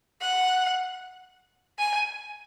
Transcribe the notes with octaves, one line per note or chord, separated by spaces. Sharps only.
F#5
G#5